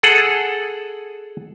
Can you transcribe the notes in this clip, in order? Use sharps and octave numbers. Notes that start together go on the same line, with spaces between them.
G#4 A4 F#5